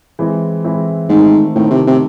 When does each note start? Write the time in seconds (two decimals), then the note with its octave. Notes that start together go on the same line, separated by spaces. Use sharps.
0.19 E3 G#3 C4 E4
0.64 E3 G#3 C4 E4
1.09 G#2 D#3 A3 C4
1.55 A2 D#3 A3 C4
1.71 C3
1.87 C3